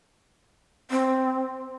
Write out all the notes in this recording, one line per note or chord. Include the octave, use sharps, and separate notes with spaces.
C4